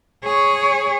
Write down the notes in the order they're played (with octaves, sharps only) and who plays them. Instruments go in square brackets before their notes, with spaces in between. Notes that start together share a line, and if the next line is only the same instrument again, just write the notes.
[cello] G#4 C#5